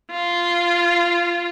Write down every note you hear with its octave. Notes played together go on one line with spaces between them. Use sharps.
F4